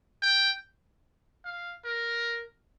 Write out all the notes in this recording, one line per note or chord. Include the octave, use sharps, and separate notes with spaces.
G5
F5
A#4